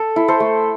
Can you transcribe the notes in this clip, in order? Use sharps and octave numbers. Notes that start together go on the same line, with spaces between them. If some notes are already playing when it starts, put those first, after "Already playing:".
Already playing: A4
E4
A4 C5
A3